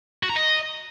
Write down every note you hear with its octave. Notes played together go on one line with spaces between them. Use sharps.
F#4
A#5
D#5